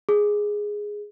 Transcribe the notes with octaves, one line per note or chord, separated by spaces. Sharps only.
G#4